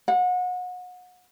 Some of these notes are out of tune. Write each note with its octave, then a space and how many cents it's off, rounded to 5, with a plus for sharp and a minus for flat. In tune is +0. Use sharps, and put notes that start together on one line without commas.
F#5 -30